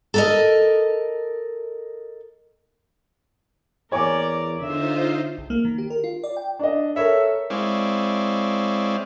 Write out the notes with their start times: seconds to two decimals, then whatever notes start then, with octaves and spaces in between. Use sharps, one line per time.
0.14 A4 A#4 D#5
3.92 E2 A#4 C#5 D5 G#5 D6
4.61 D3 D#4 F4 C5 E5
5.38 C#2
5.50 A#3
5.65 D#3
5.78 G4
5.90 A#4
6.04 F4
6.24 D5
6.37 G5
6.59 D4 D#5
6.96 A4 A#4 C#5 E5
7.50 G#3 C4 E4 C#5 D5 F5